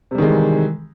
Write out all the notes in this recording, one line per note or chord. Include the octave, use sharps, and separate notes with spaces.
C3 D#3 E3 G3 G#3